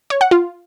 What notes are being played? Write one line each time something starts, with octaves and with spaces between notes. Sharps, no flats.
C#5
F#5
F4